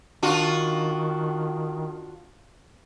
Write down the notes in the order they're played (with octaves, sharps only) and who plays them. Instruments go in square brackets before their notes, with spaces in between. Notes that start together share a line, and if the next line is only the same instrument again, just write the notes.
[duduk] D#3 [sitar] D4 F4 F#4